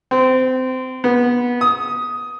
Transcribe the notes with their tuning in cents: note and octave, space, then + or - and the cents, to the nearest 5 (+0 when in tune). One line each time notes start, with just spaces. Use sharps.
C4 -25
B3 -20
D#6 +10